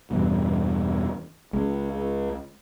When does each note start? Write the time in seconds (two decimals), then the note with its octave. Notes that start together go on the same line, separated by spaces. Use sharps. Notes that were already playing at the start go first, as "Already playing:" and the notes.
0.11 E2 G2 B2
1.53 C#2 G#3